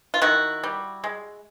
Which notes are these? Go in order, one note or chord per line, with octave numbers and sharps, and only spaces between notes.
F4
D#3 E4 F#4
G3
G#3